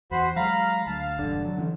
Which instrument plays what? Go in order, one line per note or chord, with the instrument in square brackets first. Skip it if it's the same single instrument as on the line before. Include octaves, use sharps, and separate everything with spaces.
[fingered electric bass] E2 [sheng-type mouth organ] F#4 C5 B5
[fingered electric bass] F#3 G#3 [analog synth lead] F5 [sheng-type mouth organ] A#5 B5
[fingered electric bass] D2 [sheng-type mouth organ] A5
[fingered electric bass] E1 G2 [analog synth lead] D3
[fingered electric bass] F#3
E3 C#4